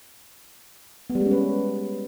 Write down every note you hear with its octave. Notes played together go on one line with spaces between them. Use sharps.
B3
G3
G#3
C#4
B4